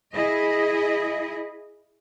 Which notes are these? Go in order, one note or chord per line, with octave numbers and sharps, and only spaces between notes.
E4 G#4 D#5